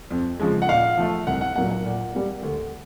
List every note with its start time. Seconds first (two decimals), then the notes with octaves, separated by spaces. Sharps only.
0.11 F2
0.40 C#3 F3 G#3
0.62 F#5
0.69 A#2 F5
0.97 F3 A3
1.27 C2 F#5
1.41 F#5
1.55 A#2 F#3 A#3 F#5
1.70 F#5
1.85 A#2
2.14 G3 A#3
2.43 D2